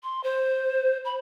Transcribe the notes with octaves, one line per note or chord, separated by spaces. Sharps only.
C6
C5
B5